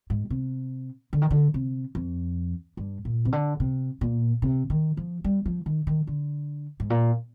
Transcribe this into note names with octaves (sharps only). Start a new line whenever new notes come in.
G#2
C3
D3
D#3
D3
C3
F2
G2
A#2
C3
D3
C3
A#2
C3
D#3
F3
G3
F3
D#3
D#3
D3
G#2
A#2